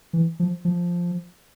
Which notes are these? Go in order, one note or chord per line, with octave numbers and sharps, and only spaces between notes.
E3
F3
F3